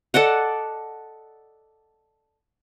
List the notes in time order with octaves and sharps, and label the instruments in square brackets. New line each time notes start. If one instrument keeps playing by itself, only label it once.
[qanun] A4 D5 D#5 F#5